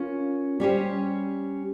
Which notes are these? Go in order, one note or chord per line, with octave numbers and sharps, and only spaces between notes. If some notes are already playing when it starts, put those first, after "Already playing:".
Already playing: C#4 F4 A#4
G3 C#4 G4 C5